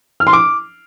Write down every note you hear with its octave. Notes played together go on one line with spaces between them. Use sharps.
F6
C6
D6